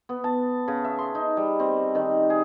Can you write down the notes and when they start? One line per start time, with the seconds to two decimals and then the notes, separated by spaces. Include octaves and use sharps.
0.09 B3
0.24 A5
0.68 C#3
0.84 E5
0.99 C6
1.15 D#4
1.37 G3
1.60 C4
1.95 D#3
2.30 G#4